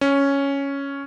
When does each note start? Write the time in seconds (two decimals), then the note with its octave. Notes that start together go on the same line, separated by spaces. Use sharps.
0.01 C#4